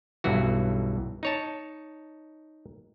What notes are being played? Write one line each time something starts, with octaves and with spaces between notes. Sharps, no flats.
B1 G2 E3 F#4
D#4 C#5 A5